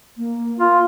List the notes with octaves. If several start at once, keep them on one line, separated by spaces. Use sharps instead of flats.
A#3
F4